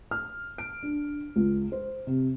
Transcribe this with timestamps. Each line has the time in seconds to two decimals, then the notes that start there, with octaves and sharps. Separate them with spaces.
0.11 F6
0.58 D7
0.83 D4
1.36 C#2
1.72 C5
2.07 C3